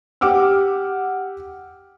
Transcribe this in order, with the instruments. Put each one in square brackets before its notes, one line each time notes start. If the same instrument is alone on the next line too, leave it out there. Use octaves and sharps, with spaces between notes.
[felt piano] G4 F#5 G5 D6 E6 F6